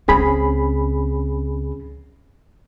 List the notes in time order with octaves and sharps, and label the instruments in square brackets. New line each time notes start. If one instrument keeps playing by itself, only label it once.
[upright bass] C#2 C4 [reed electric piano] C#4 G#4 B5